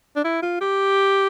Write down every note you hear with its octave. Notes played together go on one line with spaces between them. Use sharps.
D4
E4
F4
G4